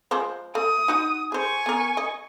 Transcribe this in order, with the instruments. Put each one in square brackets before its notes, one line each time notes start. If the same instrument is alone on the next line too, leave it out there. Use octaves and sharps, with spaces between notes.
[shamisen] F3 G#3 C5
[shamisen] A3 [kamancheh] D#6
[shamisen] D#4 F#4
[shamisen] G#4 C5 [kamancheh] G#5 C#6
[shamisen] B3 A#4
D#5